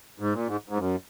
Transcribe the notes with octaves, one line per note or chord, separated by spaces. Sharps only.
G#2
A#2
G#2
G#2
F#2